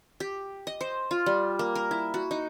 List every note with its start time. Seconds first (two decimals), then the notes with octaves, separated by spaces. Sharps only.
0.20 G4
0.67 D#5
0.81 C5
1.11 F4
1.26 G3
1.59 A#3
1.75 A#4
1.91 E4
2.14 F#4
2.31 D#4